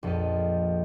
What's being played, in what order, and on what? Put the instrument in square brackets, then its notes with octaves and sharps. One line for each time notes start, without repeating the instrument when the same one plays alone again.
[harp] A#1 F2 B3 F4 A4 D#5